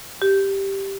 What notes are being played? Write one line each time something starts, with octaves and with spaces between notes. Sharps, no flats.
G4